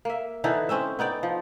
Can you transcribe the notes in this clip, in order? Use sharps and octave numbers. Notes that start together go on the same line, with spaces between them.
A#3 E5
D3 E3 D#4 A4
C4 C#4 D#5 E5
B3 D#4 D5 G5
F3